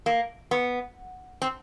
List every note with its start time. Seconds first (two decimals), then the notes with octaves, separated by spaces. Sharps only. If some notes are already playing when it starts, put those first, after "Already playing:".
0.06 A#3
0.51 B3
1.42 C4